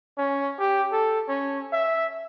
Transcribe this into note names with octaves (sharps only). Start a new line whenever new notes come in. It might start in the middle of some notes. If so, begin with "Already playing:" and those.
C#4
G4
A4
C#4
E5